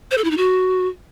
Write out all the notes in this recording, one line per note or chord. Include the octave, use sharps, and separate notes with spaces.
C5
A4
E4
D#4
F#4